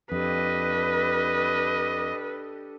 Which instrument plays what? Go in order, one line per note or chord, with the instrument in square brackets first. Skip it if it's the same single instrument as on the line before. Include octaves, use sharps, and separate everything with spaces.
[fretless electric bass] F2 [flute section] D4 G4 A4 [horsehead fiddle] B4 [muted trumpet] D#5